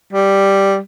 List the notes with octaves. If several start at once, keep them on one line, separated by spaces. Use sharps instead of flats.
G3